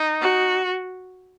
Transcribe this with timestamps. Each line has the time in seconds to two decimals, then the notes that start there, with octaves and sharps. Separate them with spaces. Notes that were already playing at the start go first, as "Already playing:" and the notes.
Already playing: D#4
0.21 F#4